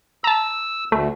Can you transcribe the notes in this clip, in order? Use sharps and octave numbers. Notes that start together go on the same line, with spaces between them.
A5 A#5 E6
D2 A3